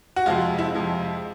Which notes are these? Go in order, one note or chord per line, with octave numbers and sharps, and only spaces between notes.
F#4
F2 C3 F3 G#3 F4
E4
F2 C3 F3 G#3